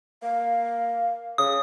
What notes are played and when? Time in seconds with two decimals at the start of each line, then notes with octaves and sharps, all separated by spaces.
0.23 A#3 F5
1.38 C#3 D#6